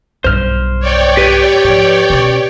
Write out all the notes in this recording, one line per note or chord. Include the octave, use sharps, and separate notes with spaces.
B1 G2 C5 F6
C#5 D5 G5
G4 B4
G#2 F3
B2 C#4